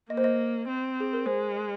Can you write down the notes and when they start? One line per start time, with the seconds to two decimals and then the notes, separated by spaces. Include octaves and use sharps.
0.10 A#3 D#5
0.17 C5
0.24 D#5
0.68 C4
1.00 G#4
1.13 A#4
1.26 G#3 C5